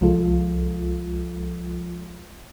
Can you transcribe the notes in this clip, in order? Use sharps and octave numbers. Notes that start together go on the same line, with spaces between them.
C2 F3 G#3 F4 A4